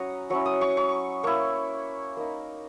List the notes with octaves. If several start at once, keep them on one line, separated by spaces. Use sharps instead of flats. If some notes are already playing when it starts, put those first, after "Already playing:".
Already playing: F#3 C#4 E4 F#5 A#5 C#6 D#6
F#3 C#4 E4 C#6
D#6
C#6
C#6
A#3 E4 C#6
A#3 D#4